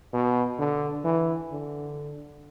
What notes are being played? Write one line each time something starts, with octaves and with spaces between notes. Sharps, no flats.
B2
D3
E3
D3